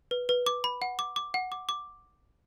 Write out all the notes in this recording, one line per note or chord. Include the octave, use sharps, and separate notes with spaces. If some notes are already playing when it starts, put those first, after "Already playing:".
B4
B4
D6
B5
F#5
D6
D6
F#5
D6
D6